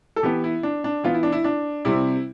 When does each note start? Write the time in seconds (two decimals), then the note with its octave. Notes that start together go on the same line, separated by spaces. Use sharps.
0.16 A4
0.23 E3 B3 G4
0.44 E4
0.63 D4
0.84 D4
1.04 E3 B3 F4
1.14 E4
1.23 D4
1.32 E4
1.44 D4
1.85 C3 G3 C4 E4